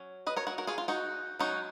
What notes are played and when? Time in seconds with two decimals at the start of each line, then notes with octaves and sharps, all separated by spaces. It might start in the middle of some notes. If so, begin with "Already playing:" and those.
Already playing: F#3 C#4
0.27 B4 D#5
0.36 A#4 C#5
0.47 F#4 A#4
0.58 F#4 A#4
0.67 F4 G#4
0.78 F4
0.88 D#4 F#4
1.39 F#3 C#4 D#4 F#4